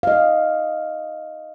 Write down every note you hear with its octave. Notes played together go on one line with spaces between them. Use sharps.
D#5 F5